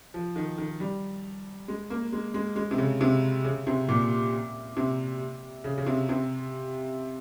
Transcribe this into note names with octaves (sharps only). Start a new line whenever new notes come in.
F3
D#3
D#3
G3
G#3
A#3
G#3
G#3
G#3
C3
C#3
C3
C#3
C3
A#2
C3
C#3
C#3
C3
C3